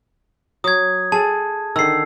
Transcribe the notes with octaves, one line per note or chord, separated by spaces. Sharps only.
F#3 D#6 G#6
G#4 A4 A5
D3 D#3 E6 C7